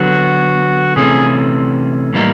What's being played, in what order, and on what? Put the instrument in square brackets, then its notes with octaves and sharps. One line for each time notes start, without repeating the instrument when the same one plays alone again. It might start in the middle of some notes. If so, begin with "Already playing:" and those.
Already playing: [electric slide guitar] D3 F#3 B3 [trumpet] F#4
[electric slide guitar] C3 E3 A3 C#4 [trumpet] G#4
[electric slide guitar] A2 E3 G3 A#3 D#4